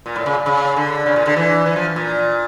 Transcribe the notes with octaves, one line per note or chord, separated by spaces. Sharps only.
A#2
A2
C#3
C#3
D3
C#3
A#2
D3
E3
E3
F3
A#2